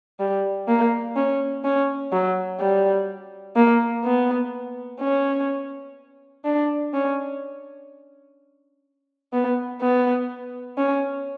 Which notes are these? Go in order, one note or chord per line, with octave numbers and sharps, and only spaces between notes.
G3
A#3
C#4
C#4
F#3
G3
A#3
B3
C#4
D4
C#4
B3
B3
C#4